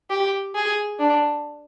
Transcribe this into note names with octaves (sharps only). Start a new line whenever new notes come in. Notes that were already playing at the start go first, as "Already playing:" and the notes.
G4
G#4
D4